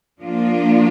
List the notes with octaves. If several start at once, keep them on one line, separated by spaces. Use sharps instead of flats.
F3 A#3 D4 F4